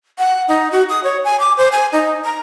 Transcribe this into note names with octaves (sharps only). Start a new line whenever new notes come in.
F#5
D#4
F#4
D#6
C#5
G#5
D6
C5
G#5
D#4
A#5